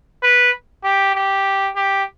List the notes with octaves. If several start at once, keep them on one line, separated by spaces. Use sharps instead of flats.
B4
G4
G4
G4